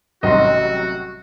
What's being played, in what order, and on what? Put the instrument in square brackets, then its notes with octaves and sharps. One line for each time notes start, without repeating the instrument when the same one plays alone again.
[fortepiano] A1 C6 [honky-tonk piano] C3 F#3 G3 [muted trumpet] F#4 [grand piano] D#5